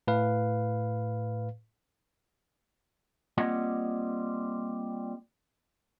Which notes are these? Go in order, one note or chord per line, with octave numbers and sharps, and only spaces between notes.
A2 B4 F5
G3 A#3 C4 F4 D#5 F#5